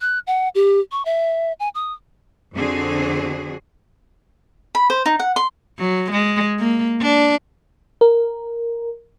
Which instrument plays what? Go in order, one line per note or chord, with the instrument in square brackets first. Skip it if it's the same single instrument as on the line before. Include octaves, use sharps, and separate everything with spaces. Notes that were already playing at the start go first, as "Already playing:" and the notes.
[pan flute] F#6
F#5
G4
C#6
E5
G#5
D#6
[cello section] F2 D3 C4 F#4 G#4
[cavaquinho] B5
C5
D#4
F#5
C6
[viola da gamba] F#3
G#3
A#3
D4
[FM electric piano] A#4